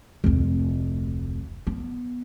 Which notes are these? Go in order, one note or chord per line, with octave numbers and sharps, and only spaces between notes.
F1 D2
B3